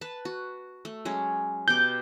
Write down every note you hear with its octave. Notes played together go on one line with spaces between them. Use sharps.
B4 A5
F#4
A3
F#3 G#3 C#4
B2 G4 D6 G6